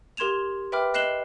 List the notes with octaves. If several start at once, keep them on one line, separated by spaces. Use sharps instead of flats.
G4 A#4 C6 G#6 E7 F7
B4 E5 G5 B5 D6 F6
D#5 F#6 C7 E7 F#7 G7